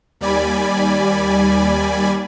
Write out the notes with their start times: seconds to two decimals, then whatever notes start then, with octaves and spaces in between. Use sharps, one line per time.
0.21 D#2 G3 D5 G#5 B5